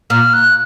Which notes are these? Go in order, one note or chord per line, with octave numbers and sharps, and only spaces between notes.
A#2 F6
F#6